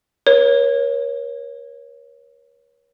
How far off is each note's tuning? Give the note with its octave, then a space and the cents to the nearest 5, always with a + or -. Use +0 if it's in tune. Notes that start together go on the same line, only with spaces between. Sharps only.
A#4 +45 C#5 -5